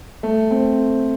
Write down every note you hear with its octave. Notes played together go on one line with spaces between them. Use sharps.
A3
C4